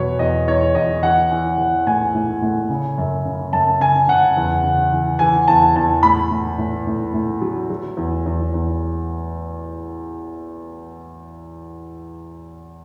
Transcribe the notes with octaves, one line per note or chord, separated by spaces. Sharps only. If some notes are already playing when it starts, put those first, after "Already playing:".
Already playing: E2 B2 F#3 B4 C#5
E2 D#5
E2 C#5
E2 D#5
E3 F#5
E3
E3
A2 G#5
A2
A2
C#3
F#2
C#3
F#2 A5
C#3 G#5
C#3 F#5
E2
C#3
E3
E3 G#5
E2 A5
E2 A5
A2 B5
A2
A2
A2
A2
F#3
F#3
E2
E2
E2